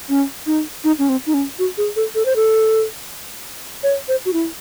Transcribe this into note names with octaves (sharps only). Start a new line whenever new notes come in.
C#4
D#4
D#4
C#4
C4
D#4
C#4
F#4
G#4
A4
A4
C5
A4
C#5
C5
F#4
E4